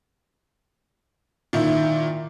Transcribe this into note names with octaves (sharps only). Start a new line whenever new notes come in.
A#2 D#3 E4